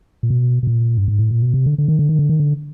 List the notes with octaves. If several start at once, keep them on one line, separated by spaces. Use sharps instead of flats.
A#2
B2
B2
A#2
G2
G#2
A2
A#2
B2
C3
D3
D3
D#3
D3
D#3
D3
D#3
D3